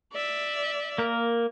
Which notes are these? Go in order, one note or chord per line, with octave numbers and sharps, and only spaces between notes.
D5 E5
A#3 A#4